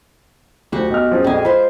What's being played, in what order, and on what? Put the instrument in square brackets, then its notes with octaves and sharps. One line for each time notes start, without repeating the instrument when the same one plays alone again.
[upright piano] D2 F3 [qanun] F#4 G4
[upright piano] B1 D#5 F6
F3 C#4 G#4
[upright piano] A#1 F2 F#4 [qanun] G#3 G#5
[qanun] F3 C5 [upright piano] B5